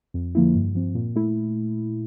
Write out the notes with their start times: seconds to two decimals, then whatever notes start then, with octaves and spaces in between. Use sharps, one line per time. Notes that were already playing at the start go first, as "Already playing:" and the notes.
0.14 F2
0.35 D3 F3 A#3 E4
0.55 G2
0.75 F3 C4
0.95 A#2
1.16 A3 E4